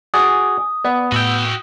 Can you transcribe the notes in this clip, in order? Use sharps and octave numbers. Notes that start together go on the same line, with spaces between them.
F#4 G#4 D5 G#5 D6 D#6
B3 D5
A2 F#4 G5 E6 G6